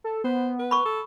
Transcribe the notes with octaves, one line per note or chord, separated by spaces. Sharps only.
A4
B3 C5
B4
B5 C#6
A4